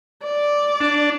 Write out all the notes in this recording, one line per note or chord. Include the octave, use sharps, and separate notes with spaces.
D5
D4